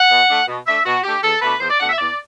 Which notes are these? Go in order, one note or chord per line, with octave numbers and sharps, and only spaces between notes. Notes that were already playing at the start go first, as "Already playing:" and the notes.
Already playing: F#5
B2
A3 D4
B2
A3 D4 E5
B2 F#4
A3 D4 G4
E2 A4
B2 A3 D4 B4
E2 C5
D5
B2 A3 D4 F#5
E5
E2 D5